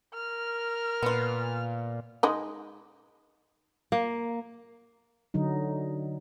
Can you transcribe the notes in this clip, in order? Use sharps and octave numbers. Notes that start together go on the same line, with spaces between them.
A#4 F6
A#2 B3 F4
G#3 D#4 D#5
A#3
D3 F#3 D#4